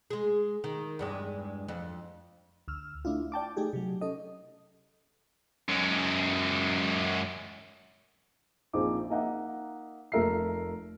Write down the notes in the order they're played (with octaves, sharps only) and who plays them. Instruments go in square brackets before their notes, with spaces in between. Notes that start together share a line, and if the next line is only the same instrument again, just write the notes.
[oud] G#3 G#4
D#3
E2 G2 G#3
F2
[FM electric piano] D2 E6 F6
A3 D4 E4 F4
D5 G5 A5 D6
A3 D#4 G4 G#4
C3 F#3
C#4 A4 D#5
[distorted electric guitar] F#2 G#3
[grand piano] A#1 C4 D#4 F4 G#4 D6
A#3 D#4 D#5 E5 F#5
F1 A3 A4 A#4 E5 C7